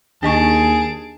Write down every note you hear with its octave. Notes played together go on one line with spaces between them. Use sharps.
D#2 D4 G#4 D#5 A5 C#6 D7